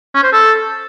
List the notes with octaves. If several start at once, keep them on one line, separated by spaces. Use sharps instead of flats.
C#4
C5
A4